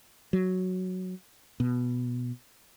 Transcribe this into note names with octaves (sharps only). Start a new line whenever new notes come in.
F#3
B2